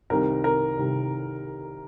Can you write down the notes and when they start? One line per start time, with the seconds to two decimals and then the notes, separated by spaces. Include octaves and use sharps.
0.10 C2 C3 D#3 A#4
0.44 A#4
0.77 C2 C3 D#3